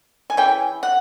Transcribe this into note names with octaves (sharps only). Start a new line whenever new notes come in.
G#5
C#3 E3 G5
F#5